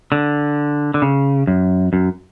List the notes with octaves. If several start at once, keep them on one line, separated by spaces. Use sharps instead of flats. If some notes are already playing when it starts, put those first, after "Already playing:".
D3
D3
C#3
F#2
F#2